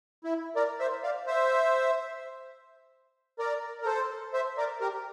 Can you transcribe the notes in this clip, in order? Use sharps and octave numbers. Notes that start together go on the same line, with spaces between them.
E4
A#4 D5
C5 E5
D5 F5
C5 E5
A#4 D5
A#4
A4 C5
C5 E5
A#4 D5
G4 A#4